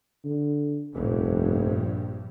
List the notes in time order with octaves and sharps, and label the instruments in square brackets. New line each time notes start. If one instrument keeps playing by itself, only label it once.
[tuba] D3
[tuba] F1 [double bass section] A#1 G2